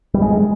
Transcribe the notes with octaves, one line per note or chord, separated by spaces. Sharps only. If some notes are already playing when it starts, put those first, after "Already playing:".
G3
G#3